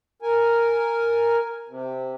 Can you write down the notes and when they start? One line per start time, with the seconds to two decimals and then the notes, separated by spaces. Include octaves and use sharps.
0.22 A#4 G#5
1.69 C3